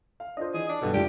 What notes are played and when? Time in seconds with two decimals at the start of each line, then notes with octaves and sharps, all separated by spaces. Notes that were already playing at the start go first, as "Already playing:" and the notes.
0.20 F5
0.37 D4 F4 C5 D#5
0.54 E3 G#4
0.69 D4
0.81 G2 B2 F#4 A4
0.94 F#1 G#2 D4 F4 G4 D7